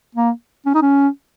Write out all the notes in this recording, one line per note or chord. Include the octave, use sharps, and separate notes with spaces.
A#3
C#4
D#4
C#4